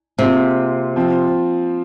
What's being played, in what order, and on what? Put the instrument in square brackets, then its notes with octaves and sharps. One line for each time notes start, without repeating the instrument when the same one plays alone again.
[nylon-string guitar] C3 [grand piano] A#3 F4 G#4
[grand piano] F3 C4 F4